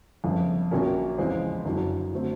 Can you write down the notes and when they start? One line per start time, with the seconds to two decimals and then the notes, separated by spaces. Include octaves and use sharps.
0.24 G1 F2 C#3
0.71 A#1 A#2 F#3 A#3 C#4
1.18 E2 C#3 F3 G#3 C4
1.65 F#1 F#2 D3 F#3
2.13 D3 F#3 A3 C4